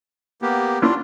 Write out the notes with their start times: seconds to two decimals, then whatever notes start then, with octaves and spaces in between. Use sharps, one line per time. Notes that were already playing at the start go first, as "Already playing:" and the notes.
0.42 A#3 B3 G4
0.82 A#3 C#4 D4 E4 F4